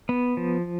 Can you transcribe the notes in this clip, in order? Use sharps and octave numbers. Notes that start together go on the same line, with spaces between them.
B3
F3